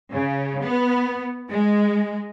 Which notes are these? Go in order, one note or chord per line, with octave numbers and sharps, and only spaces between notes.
C#3
B3
G#3